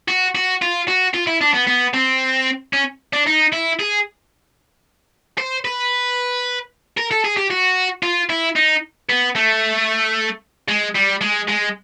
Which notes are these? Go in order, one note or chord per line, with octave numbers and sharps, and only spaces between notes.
F#4
F#4
F4
F#4
F4
E4
D4
B3
B3
C4
C#4
D4
D#4
E4
G#4
C5
B4
A#4
A4
G#4
G4
F#4
F4
E4
D#4
B3
A3
G#3
G3
G#3
G#3